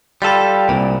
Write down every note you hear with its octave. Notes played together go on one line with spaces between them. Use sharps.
G3 F4 A4 F5 G5 B5
C2 A#2 D5